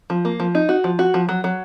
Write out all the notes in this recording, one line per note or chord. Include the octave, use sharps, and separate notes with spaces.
F3
A#3
F3
D#4
F#4
F3
F#4
F3
F#3
F#3